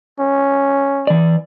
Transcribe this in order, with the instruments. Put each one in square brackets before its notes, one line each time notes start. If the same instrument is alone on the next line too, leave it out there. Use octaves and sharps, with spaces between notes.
[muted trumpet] C#4
[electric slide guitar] E3 D5